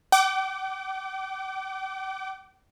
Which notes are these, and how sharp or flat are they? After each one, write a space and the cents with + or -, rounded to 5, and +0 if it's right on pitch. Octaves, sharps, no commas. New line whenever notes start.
G5 -45 D6 -5